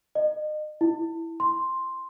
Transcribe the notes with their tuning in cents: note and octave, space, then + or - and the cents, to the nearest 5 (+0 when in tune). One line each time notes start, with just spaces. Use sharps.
D#5 -35
E4 +0
C6 +5